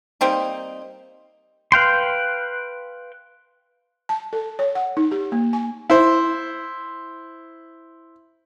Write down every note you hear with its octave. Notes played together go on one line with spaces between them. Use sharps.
G3 A#3 C4 D#4
B4 F5 G5 C6
A5
A4
C#5
F#5
D#4
G4
A#3
G#5
E4 C5